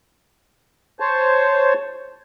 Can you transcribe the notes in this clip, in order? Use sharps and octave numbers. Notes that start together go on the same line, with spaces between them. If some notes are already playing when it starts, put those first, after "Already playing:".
C5 C#5 A5